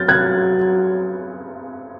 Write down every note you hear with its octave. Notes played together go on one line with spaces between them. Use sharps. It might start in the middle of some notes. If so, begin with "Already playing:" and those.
Already playing: F#3 F6 G6 A6
F#6 G#6